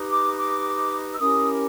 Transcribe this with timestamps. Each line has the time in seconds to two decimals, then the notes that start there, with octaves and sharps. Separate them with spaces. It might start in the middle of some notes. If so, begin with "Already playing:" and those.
Already playing: D#4 G4 B4
0.10 D6
0.37 D6
1.13 E6
1.19 C#4 E4 G4 A#4 D#6